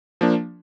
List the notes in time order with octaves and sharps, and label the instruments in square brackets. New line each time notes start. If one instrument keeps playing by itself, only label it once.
[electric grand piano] F3 A#3 D4